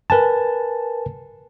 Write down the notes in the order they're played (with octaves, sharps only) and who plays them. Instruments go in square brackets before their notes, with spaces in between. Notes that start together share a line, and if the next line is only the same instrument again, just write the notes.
[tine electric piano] A#4 B4 G#5 A5